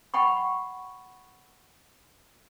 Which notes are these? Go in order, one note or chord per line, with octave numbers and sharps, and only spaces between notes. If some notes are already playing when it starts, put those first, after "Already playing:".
F#5 G5 B5 C#6